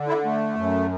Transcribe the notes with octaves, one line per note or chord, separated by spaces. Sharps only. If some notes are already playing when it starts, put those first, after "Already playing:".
Already playing: D3
E4
A3
F#2